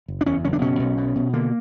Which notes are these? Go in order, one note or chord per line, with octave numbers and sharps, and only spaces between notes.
F#1
D4
E2 C#4
F#1 C#4
D4
B2 C#4
B1
B2
B2
D3 A#3